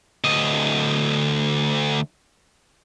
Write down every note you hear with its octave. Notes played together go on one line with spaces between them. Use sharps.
D2 D#5